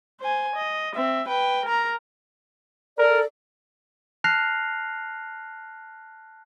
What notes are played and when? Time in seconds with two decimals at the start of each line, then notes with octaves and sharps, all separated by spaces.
0.21 C5 G#5
0.56 D#5
0.95 C4 E5
1.28 B4 G5
1.65 A#4 A#5
2.98 A4 A#4 D5
4.24 A5 F6 F#6 A#6 C7 F7